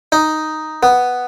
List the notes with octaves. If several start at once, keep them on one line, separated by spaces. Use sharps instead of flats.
D#4
B3